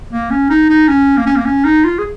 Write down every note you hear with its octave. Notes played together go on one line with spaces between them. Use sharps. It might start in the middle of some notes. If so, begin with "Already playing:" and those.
A#3
C#4
D#4
D#4
C#4
A#3
C#4
A#3
C#4
D#4
F4
G#4